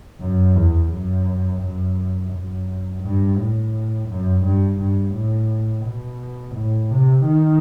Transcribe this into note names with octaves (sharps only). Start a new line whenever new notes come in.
F#2
E2
F#2
F#2
F#2
G2
A2
F#2
G2
G2
A2
B2
A2
C3
D#3